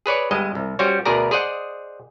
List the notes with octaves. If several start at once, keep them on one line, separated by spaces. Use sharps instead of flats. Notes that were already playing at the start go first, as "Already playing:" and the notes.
G#4 B4 C#5 D5
G1 G2 G#3 D#5
C2
G3 C#4 F#4 C5 C#5
D2 B2 G#4 A#4 D5 A#5
G#4 C5 D5 D#5 F#5